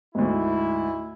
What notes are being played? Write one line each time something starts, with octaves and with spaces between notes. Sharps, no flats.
D2 G#2 E4